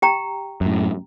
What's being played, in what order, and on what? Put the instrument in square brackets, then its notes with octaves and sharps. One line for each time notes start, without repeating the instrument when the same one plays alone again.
[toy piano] G4 G5 A#5
[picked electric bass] F#2 A2